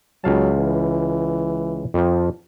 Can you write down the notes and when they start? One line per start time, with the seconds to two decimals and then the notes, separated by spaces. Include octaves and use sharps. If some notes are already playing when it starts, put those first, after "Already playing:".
0.24 C#2 F#3 F5 A5
0.57 E3
1.94 F2 F3